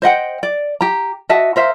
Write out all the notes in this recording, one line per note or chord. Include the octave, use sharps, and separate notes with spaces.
C5 D#5 F#5 G5
D5
G4 A#5
F#4 D#5 E5 A5
A#4 C5 E5 F5